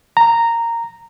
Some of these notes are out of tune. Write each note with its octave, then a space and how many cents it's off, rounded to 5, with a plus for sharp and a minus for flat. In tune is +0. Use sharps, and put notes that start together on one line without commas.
A#5 -10